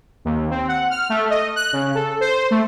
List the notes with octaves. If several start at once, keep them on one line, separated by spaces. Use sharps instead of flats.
D#2
C4
F#5
F6
A3
D#5
F#6
C#3
A4
C5
A3